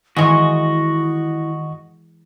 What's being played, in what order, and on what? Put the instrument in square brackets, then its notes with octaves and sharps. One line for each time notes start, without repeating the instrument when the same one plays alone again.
[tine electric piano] D#3 [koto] E3 G#3 [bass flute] E4 [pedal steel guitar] F#4 D#5 C#6